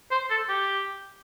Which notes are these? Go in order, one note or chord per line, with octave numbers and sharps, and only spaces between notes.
C5
A4
G4